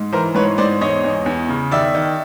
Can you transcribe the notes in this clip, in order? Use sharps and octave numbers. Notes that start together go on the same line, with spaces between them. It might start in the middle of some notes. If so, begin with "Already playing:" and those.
Already playing: G#2
E3 A#4 C5
G#2 B4 C#5
G#2 C5 D5
E2 C#5 D#5
E2
E2
C#3
D#3 D5 E5
D#3